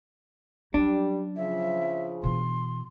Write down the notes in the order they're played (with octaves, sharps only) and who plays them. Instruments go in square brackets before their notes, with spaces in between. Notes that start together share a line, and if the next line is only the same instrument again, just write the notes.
[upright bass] F#3 C#4 [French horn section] G3 [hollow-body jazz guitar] D4
[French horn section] C#3 F3 [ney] E5
[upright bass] B2 E3 [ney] C6